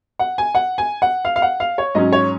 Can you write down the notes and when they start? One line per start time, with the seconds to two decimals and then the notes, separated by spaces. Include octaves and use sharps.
0.19 F#5
0.38 G#5
0.55 F#5
0.78 G#5
1.02 F#5
1.25 F5
1.36 F5
1.42 F#5
1.60 F5
1.78 C#5
1.95 G#2 F#3 C#4 D#5
2.13 C#5